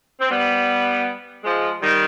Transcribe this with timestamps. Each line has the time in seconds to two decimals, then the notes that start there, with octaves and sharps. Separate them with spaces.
0.20 C4
0.31 G3 B3
1.44 F3 G#3
1.82 D#3 G3